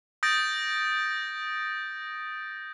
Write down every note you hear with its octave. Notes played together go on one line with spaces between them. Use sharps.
D#6 G6 A6 A#6 D7